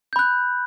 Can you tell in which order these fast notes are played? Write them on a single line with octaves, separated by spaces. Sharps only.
G6 B5 F#6